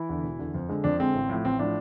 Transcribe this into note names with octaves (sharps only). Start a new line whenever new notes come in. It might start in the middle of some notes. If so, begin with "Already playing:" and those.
Already playing: E3 E4
E2 D3
E1
E2 D3
F2
D3 G#3
F2 D4
D3 G#3 C4
A1
A2 F3
A1 C4
A2 F3 D4